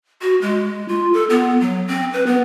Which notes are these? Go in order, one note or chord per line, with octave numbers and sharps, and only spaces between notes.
F#4
G#3
F4
A4
B3
F#3
C4
B4
B3